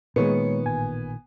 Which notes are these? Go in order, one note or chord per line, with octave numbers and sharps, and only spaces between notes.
A#2 D#3 G#3 B3 C#5 C#7
A1 G#5